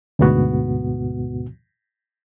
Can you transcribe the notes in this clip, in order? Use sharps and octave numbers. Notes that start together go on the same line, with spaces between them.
D2 G#2 B2 B3 F#4